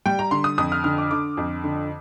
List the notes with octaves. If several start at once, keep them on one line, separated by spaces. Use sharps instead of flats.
G3 G5
A#5
D3 C6
D#6
F2 D#6
F6
D3 F6
D6
D3 D6
F2
D3